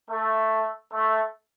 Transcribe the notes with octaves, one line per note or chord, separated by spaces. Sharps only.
A3
A3